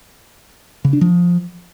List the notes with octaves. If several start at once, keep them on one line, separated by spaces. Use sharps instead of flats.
C#3
D4
F3